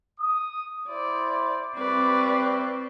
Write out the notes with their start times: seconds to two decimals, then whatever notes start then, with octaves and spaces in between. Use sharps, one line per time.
0.20 D#6
0.89 E4 C5 D5
1.77 G3 C4 E4 B4 D5 C#6